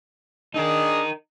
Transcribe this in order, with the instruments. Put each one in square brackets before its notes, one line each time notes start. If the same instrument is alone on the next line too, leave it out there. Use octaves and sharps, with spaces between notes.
[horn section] D#3 D4 G#4 [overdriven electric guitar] D#4 A#4